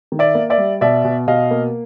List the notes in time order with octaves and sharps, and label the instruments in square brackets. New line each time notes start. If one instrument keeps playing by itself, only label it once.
[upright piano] D#3
D5 E5
A#3
D5 E5
G3
B2 D5 E5
B2
B2 D#5 F5
A#3